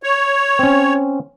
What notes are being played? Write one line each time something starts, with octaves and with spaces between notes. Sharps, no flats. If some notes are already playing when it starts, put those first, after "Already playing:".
C#5
C4 C#4